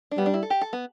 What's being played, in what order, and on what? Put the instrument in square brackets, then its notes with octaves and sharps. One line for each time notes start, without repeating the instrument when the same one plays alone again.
[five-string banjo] D4
[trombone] G3 [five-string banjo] B3
[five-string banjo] D4
E4
A4
G4
A4
B3